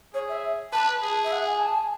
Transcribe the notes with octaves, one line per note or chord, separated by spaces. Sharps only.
G#4 C#5
E5
B4 A5
G#4 A5
E5
F#5
G#5
A5
G#5